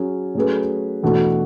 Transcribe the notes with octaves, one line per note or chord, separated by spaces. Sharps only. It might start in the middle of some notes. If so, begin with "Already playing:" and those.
Already playing: F#3 C#4 G#4
F#3 A3 C#4 G#4 B4
E2 B2 A3 D4 F#4